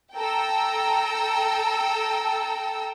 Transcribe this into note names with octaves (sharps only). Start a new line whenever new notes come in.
A4 G5 A#5 E6